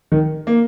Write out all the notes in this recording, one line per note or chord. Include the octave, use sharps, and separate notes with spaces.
D#3
A#3